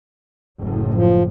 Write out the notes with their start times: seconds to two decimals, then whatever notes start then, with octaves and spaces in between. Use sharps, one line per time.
0.59 F#1 A2
0.94 F3